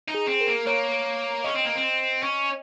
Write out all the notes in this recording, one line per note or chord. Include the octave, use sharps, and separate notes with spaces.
D#4
G#4
C4
A#4
A#3
A#3 C#5
C#4 D#5
C4
A#3
C4
C#4